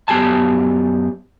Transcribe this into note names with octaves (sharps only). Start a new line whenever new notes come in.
F#2 B3 G4 G#5 A5